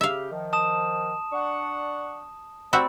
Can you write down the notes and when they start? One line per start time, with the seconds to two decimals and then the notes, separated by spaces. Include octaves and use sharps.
0.01 C#3 G4 E5 F5
0.32 D#3 F3
0.53 A5 D#6 E7
1.32 D4 F#5 C#6
2.73 C3 A3 C4 F#4 D5 E5 B5